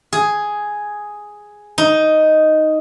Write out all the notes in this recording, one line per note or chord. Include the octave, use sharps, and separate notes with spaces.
G#4
D#4